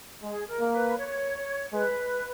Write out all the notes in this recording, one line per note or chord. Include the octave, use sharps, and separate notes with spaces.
G#3 G#4
A#4
A#3
B4
C#5
G#3 B4